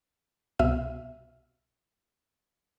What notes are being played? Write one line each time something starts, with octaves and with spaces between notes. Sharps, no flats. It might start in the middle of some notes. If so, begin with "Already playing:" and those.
C2 B2 E5 F6 D#7